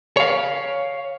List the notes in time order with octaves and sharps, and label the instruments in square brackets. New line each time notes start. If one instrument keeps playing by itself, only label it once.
[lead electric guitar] C#5 F5